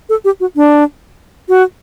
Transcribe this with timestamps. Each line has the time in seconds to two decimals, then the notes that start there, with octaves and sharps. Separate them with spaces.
0.09 A4
0.25 G4
0.40 F#4
0.56 D4
1.49 F#4